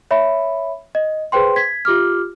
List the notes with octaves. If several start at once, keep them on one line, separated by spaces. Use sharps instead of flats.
C#5 E5 B5
D#5
G#4 B4 C5 G5 C6
G#6 B6
F4 G4 D6 F6